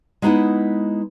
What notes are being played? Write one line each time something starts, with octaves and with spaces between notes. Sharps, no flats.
G#3 B3 D#4 E4 B4 F#5